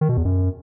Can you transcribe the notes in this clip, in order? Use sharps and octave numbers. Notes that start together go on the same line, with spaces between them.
D#3
B2
E2
F#2